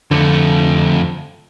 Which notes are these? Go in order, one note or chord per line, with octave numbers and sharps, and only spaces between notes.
F2 D3 A3